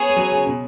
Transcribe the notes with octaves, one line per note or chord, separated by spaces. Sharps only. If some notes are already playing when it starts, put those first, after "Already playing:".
Already playing: B3 G#4 C#5 G#5
G#3
F#3
C#3
B2